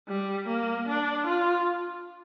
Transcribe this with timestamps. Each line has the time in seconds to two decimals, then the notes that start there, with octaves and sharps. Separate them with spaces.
0.08 G3
0.48 A#3
0.88 D4
1.27 F4